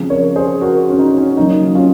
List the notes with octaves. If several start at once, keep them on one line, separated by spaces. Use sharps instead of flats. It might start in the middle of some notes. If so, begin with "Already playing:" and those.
Already playing: C#3 F3 G#3 C4
A#4 C#5
G#4 C5
F#4 A#4
C#4
D#4
C#4
C#3 F#3 A#3 D#4
C#4 F4